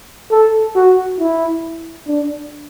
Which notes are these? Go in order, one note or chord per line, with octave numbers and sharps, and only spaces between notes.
A4
F#4
E4
D4